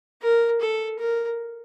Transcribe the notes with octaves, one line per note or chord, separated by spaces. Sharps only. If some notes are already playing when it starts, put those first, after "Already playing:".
A#4
A4
A#4